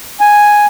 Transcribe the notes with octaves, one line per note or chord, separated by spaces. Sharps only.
G#5